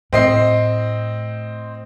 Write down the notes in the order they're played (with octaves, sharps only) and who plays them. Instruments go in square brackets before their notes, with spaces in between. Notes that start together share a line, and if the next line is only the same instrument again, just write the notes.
[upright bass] A2 [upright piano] C4 D#5 C7